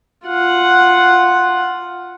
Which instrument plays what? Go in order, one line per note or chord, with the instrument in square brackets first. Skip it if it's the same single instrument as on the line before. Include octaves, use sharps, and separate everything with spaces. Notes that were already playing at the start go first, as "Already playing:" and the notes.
[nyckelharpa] F4 F#5